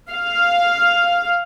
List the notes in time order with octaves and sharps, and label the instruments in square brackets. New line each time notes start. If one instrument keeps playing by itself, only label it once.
[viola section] F5